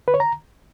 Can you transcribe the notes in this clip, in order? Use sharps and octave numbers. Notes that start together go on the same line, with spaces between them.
B4
C#5
A#5